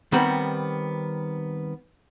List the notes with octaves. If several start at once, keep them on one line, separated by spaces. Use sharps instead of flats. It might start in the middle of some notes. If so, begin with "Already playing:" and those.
D#3 G3 B3 C4 B4